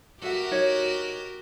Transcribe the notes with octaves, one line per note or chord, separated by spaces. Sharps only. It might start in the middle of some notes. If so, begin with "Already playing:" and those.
F#4 G4 A4 A#4 E5 F#5
D#4 C#5 D#5